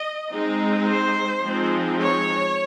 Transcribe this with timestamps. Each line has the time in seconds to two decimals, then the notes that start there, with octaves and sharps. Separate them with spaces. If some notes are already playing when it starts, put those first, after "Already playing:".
Already playing: D#5
0.32 G#3 C4 D#4
0.88 C5
1.43 F3 G#3 C4 D#4
2.00 C#5